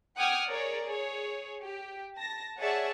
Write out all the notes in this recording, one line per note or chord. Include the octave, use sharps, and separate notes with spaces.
F#5 G5 D6 D#6 F6 G#6
G#4 A#4 C#5 D5
G#4 C#5
G4
A5 A#6
G#4 C#5 D5 E5 F#5 A5